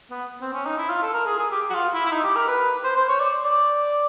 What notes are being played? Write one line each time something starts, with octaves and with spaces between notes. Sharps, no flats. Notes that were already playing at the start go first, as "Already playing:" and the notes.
B3
C4
C#4
D#4
E4
F4
A4
A#4
G#4
G#4
G4
F#4
F4
E4
E4
D#4
G4
A#4
B4
C5
C5
C#5
D5
D5